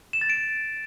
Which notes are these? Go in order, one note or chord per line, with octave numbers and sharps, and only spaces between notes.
E7
A6
D7